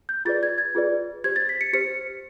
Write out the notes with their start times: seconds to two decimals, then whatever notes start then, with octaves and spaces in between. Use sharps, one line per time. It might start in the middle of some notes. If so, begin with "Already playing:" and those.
0.09 G6
0.25 F4 G#4 B4 D5 A6
0.43 G#6
0.58 G#6
0.75 F4 G#4 B4 D5
1.24 G4 C5 G#6
1.36 A6
1.49 B6
1.61 C#7
1.73 G4 C5 C#7